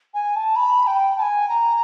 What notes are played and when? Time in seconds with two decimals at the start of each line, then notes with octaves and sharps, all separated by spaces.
0.14 G#5
0.36 A5
0.56 B5
0.87 G5
1.18 A5
1.22 G#5
1.49 A#5